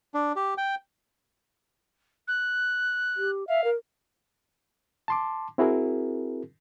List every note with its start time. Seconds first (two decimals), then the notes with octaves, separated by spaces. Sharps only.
0.14 D4
0.36 G4
0.58 G5
2.28 F#6
3.17 G4
3.48 E5 F5
3.64 A#4
5.08 A5 C6 D6
5.58 C4 E4 F#4 G#4 A#4